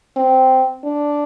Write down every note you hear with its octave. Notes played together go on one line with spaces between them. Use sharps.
C4
D4